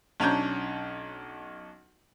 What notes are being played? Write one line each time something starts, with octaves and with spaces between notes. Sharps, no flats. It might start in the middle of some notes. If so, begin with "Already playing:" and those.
B1 C#4 D4 A#5 G6